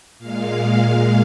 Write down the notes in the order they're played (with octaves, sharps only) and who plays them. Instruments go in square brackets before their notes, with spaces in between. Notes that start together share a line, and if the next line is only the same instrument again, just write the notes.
[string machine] A#2 G#3 F5
F5